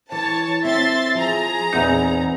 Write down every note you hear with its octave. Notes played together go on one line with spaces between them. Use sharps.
E3 C#5 A5
C4 E5 C6 A6
F3 G#4 A#5
E2 A#2 C4 D#4 B4